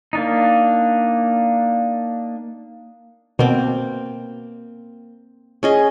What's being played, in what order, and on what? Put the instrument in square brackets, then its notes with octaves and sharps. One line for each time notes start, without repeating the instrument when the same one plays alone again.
[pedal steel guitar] A#3 D4 D#4
[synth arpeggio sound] B2 [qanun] A#3 C4
[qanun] C#4 G#4 D#5